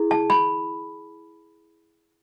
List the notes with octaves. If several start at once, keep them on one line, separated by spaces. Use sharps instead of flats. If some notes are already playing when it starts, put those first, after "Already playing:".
Already playing: E4 G#4
A5
B5